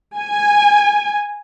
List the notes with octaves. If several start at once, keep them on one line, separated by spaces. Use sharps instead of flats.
G#5